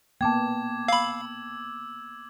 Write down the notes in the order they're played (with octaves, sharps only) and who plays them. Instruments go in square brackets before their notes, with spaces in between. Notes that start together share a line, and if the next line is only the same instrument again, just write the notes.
[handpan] A#3 B3 [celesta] G5 A5 [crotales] D6 G#6
[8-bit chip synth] F5 B5 [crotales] E6